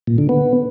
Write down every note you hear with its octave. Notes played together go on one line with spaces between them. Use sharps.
A#2
D3
B3